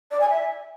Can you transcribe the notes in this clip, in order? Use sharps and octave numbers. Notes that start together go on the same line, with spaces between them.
D5
G#5
E5